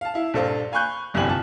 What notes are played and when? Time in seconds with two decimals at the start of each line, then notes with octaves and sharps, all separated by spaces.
0.01 F5 A5
0.14 E4 F5
0.34 A#1 G2 A4 C5 F5
0.72 F5 G#5 B5 C#6 F#6 G6
1.14 G1 C2 F2 G4 G#5 F#7
1.27 F4 A5